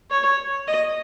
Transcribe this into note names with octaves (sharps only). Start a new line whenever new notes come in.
C#5
D#5